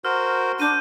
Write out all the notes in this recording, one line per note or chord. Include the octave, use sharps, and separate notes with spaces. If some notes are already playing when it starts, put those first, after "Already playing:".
F#4 A#4 C5 F6
D4 G6 D#7